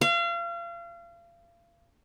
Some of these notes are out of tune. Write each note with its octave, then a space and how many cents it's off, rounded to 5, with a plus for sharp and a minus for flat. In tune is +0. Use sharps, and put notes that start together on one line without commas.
F5 -35